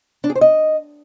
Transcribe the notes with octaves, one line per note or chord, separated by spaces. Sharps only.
D4
G#4
C5
D#5